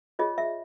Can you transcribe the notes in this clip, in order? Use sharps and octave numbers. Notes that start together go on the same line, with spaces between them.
F4 G#4 C#5 D#5
E5